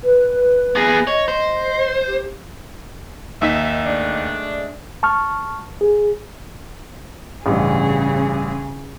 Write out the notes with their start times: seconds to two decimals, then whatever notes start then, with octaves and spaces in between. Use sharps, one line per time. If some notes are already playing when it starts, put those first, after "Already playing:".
0.03 B4
0.76 B3 G#4 A#6
1.07 C#5 D#5
1.28 C5
2.07 G4
3.42 D#2 D#4 E5 B6
3.86 G#3 A3 D4
5.03 A5 C#6 F6
5.81 G#4
7.46 A1 G2 C#3 G#4